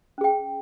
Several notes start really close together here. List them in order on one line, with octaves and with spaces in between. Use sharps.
C#4 G#4 G5